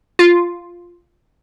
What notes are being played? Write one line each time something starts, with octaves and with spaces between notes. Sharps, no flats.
F4